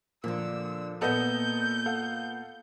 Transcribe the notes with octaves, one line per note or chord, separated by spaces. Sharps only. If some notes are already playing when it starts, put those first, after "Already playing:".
A#2 D3 F3 A#3 E6
A#2 A#3 B3 A4 D#5 G6
A4 F5 F#5